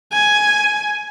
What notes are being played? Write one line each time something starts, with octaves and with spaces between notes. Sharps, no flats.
G#5